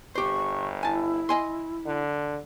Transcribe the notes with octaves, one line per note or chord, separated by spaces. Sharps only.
G1 G4 C5 C#6
E4 G#5 A5
D#5 G#5 C6
D3